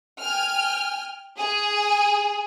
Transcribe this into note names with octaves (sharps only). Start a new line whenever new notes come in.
G5 G#5 F6
G#4